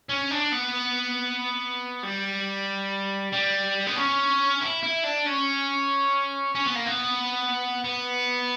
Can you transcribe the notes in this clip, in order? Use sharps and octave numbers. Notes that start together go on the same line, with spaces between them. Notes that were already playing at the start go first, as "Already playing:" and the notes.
C#4
D4
B3
G3
G3
B3
C#4
E4
E4
D4
C#4
C#4
B3
A#3
B3
B3